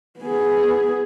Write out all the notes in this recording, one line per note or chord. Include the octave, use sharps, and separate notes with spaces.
B3 G#4